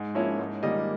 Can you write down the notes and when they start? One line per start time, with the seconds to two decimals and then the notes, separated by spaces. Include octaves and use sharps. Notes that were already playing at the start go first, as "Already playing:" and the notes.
Already playing: G#2
0.15 F3 A#3 C#4 E4
0.39 G#2
0.63 D#3 G3 A#3 D#5